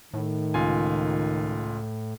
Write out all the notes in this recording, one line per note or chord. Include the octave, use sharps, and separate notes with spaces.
A2 D#3
C#2 F4 G#5